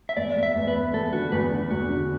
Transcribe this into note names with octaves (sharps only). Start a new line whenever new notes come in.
E5
E2 D5
E2
E5
E2
B4
B3
E2 A4
D3 F#4
E2 B4
D3
E2 F#4
D3